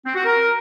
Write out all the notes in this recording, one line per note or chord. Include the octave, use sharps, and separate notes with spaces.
C4
F#4
A#4